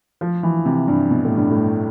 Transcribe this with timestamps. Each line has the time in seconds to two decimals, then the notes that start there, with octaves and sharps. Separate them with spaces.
0.21 F3
0.43 E3
0.65 C3
0.88 G2
1.11 B2
1.25 A2
1.37 G2
1.51 A2